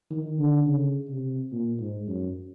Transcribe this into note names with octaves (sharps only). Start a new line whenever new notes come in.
D#3
D3
C#3
C3
A#2
G#2
F#2